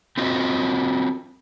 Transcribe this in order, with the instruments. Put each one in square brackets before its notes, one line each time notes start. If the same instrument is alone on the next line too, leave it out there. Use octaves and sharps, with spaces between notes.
[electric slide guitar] C4 F4 F#4 D#5